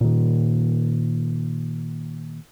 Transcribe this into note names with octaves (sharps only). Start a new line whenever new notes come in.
A#2 D#3